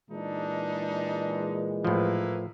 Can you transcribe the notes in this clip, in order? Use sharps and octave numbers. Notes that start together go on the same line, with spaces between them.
A#2 E3 G#3 D4 D#4
A2 F3 A#3 E4 B4